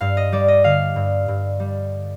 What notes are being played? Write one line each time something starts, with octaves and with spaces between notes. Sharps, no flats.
G2 F5
D#5
G3 D5
D#5
D3 F5
G2
G2
G3